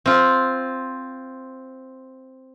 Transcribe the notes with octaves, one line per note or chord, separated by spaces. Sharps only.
C4 F4